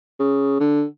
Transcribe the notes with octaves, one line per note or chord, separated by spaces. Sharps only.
C#3
D3